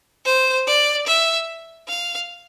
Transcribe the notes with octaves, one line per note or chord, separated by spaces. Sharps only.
C5
D5
E5
F5